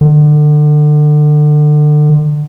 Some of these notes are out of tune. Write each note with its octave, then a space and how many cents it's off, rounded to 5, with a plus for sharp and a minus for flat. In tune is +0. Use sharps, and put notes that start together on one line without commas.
D3 +30